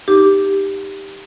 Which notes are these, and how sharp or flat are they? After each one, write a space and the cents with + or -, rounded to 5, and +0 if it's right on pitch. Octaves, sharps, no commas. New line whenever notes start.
D#4 +0 G4 +5 D6 +0